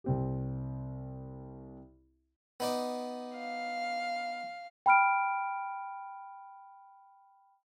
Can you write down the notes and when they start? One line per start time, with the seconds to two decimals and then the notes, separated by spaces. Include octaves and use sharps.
0.04 C2 C4 G4
2.60 B3 D#4 D5
3.37 F5
4.86 G5 B5 F6 D7